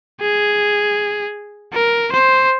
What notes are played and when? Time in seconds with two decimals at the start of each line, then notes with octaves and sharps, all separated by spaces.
0.21 G#4
1.74 A#4
2.12 C5